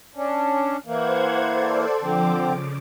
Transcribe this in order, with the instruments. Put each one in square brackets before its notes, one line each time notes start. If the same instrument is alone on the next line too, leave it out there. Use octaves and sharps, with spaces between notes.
[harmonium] C#4 D4
[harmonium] E3 A#3 [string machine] C5 F#5 G#6
[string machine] A4 C5 D5
[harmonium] D3 C4 [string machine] F3 D6
[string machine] C#3